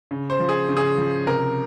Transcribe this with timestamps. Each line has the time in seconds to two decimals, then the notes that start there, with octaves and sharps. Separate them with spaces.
0.11 C#3
0.30 C5
0.40 F3
0.49 G#4
0.69 C#3
0.77 G#4
0.98 F3
1.26 C3 A#4